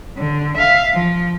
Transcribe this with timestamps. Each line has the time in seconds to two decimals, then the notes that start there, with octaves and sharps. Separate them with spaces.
0.18 D3
0.58 E5 F5
0.94 F3